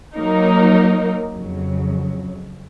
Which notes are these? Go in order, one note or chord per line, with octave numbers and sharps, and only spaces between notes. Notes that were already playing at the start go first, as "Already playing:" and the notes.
F#3 A#3 D#4 A#4
F2 C#3 F#3